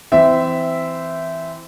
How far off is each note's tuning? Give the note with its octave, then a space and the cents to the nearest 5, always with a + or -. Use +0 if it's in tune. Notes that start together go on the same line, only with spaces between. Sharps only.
E3 +0 C4 -20 E5 +0